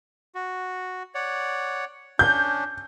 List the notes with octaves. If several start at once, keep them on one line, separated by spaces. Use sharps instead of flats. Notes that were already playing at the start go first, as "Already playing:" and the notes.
F#4
C#5 D5 F#5
C#4 D4 G6